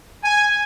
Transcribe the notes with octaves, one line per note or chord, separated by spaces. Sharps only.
G#5